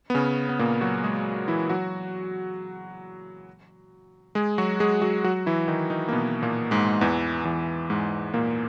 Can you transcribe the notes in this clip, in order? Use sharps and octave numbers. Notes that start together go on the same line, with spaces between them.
B3
C#3 C#4
B3
A#2 A#3
F#3 F#4
G#3 G#4
E3 E4
F#3 F#4
G#3 G#4
F#3 F#4
G#3 G#4
F#3 F#4
F#3 F#4
E3 E4
D#3 D#4
D#3 D#4
A#3
B2 B3
A#2 A#3
G#2 G#3
E2 E3
E2 E3
G#2 G#3
A#2 A#3